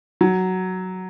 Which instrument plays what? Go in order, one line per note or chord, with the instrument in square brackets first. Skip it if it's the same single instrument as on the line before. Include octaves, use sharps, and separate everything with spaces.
[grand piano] F#3